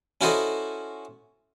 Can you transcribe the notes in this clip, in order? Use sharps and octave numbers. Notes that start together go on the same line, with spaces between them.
C#4 E4 F#4 A4 C5 D#5